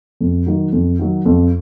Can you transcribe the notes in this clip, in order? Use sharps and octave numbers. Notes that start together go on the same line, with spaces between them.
F2
D#3 F#3
F2
D#3 F#3
F2